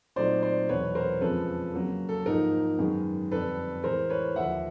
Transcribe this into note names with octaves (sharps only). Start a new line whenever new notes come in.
A#2 F#3 A3 C4 D#4 C5 D5
C5 D5
E2 B2 F#3 B4 C#5
A#4 C5
F2 C#3 F3 G#3 A4 B4
C#3 F#3 A#3
A4
G#2 F3 A#3 D#4 A#4
F#2 D#3 G#3 B3
F2 D3 G3 A4 B4
A2 E3 G#3 A#4 C5
B4 C#5
D#2 D3 F3 A#3 E5 F#5